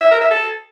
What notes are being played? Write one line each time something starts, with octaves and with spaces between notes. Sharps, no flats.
E5
A#4
E5
A4